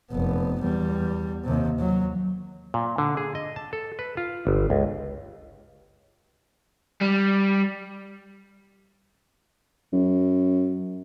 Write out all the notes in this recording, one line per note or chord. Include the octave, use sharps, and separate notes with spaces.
F1 B3
E2 G3
D#2 C3
F#3
A#2
D3
G#4
D#5
A5
A4
B4
F4
G1
C#2
G3
F#2